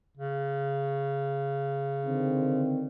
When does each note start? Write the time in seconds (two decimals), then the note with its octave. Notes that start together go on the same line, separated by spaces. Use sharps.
0.18 C#3
2.05 D3 D#3 C4